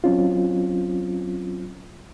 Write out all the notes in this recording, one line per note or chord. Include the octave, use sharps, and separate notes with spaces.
F#3 C4 C#4 F4